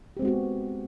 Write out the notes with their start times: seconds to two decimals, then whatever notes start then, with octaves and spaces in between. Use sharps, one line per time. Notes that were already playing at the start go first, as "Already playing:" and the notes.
0.17 G4
0.19 C4
0.22 G#3
0.25 F#4
0.28 B3